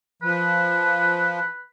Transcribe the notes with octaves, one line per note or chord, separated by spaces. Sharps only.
F3 B4